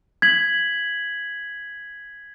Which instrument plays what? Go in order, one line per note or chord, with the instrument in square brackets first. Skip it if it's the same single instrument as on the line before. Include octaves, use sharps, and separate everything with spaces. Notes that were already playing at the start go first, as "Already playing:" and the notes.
[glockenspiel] G#6 B6 F#7